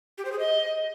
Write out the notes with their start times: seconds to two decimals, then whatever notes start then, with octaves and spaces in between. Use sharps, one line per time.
0.18 G4
0.25 C5
0.32 G#4
0.39 D#5